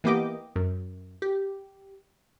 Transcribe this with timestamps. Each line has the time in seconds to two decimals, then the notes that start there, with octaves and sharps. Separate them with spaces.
0.04 E3 A#3 B3 G4 D#5 D6
0.56 F#2
1.22 G4